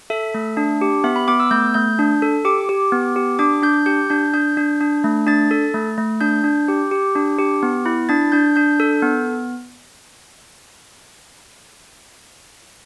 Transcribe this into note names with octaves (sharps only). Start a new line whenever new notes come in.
A4 E5
A3
D4
G4
B3 E5
B5
B3 D6
E6
A3 G6
A3 G6
D4
A4
G4 D6
G4
B3
G4
D4 D6
D4 G6
G4 G6
D4 G6
D4 G6
D4
D4
A3
D4 A6
A4
A3
A3
D4 G6
D4
G4
G4
D4
G4
B3
E4
D4 A6
D4 G6
D4 G6
A4
B3